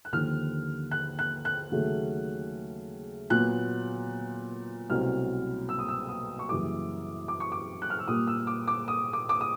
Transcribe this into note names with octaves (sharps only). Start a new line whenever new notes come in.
F#6
D#2 D3 F3 A#3 F6
F#6
F#6
F#6
D#2 C#3 F#3 A3
A#2 F#3 B3 F#6
C2 B2 F#3 A3 C4 F6
E6
D#6
E6
D#6
C#6
F#2 C#3 E3 G3 A#3 D6
D6
C#6
D6
F#6
F6
E6
A#2 G3 A#3 D#6
E6
D6
D6
D#6
D6
D6
D#6